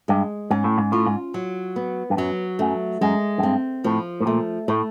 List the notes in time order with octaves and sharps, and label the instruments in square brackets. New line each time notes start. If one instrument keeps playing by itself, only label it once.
[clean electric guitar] G2 [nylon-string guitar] G#3
[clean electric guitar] G#2 [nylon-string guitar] C#4
[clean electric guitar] A2
G#2
[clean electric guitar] A2 [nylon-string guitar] F4
[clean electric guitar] G#2
[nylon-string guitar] F#3
B3
[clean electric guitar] G2
[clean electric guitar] F#2 [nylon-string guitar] F#3
[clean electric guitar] F#2 [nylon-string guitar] A3
[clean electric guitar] F#2 [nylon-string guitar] G#3
[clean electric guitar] F#2
[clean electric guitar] G2 [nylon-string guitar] C4
[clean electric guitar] A2 [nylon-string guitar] F3
[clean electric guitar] A2
[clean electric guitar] A#2 [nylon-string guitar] A3
[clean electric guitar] A2 [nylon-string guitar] A3